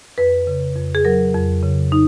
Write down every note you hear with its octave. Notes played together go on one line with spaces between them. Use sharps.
F2 B4
C#3
F2
G#4
F#3 A#4
F2
C#3
D#4